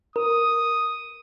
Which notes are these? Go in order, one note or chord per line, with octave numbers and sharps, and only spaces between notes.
A#4 D#6